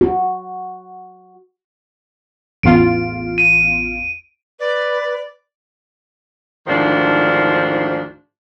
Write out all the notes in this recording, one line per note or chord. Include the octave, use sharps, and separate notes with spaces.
F#4
A1 E2 F4 D7
D#7
B4 D5
D2 G#2 D#3 F3 D4 C5